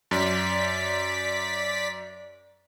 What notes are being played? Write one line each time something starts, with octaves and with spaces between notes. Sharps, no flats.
F#2 D5 B6